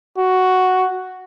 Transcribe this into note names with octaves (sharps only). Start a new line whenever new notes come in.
F#4